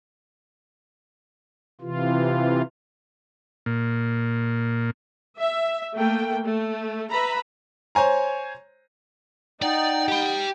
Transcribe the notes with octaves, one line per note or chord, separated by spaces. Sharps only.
C3 E3 F4
A#2
E5
A3 A#3 G5
A3
B4 E5 A#5 B5
C5 C#5 G#5 A#5
D#4 D5 F#5 G5
G4 B5